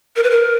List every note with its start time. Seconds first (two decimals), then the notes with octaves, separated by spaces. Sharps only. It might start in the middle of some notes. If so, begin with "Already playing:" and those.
0.16 A#4
0.23 B4
0.30 A#4